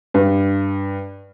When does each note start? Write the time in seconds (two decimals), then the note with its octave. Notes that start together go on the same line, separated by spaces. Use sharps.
0.14 G2